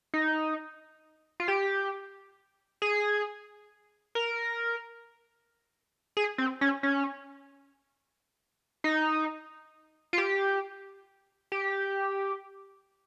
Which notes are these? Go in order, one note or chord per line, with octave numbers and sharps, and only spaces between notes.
D#4
F4
G4
G#4
A#4
G#4
C4
C#4
C#4
D#4
F4
G4
G4